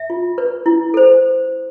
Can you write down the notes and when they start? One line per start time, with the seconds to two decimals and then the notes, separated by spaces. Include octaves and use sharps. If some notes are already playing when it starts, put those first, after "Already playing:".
Already playing: E5
0.10 F4
0.38 B4
0.66 E4
0.94 A4 C5